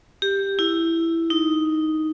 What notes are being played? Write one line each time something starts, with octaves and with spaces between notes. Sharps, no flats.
G4
E4
D#4